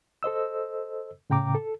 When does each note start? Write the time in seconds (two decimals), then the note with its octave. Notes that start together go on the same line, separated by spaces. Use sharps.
0.23 A4 C5 D#5 E6
1.30 A2 C#3 G5 A#5 D6
1.55 A4